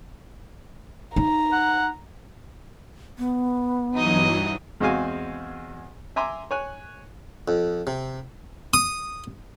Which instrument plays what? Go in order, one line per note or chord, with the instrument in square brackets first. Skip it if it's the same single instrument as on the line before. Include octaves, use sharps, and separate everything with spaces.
[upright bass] D#4 [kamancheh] A#5
[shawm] F#5
[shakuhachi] B3
[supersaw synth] G2 E3 F#3 [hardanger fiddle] D#4 D#5
[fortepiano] E2 G#3 C4 F#4 F5 G#5
E5 G#5 A#5 C6 D6
C#5 G#5 F#6
[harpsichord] F2
C3
D#6